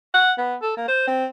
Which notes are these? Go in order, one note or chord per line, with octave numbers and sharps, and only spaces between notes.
F#5
B3
A4
A#3
C5
C4